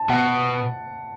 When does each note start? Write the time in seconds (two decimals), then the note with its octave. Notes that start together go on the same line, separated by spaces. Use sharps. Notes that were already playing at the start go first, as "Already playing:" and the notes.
Already playing: A5
0.09 B2 F#5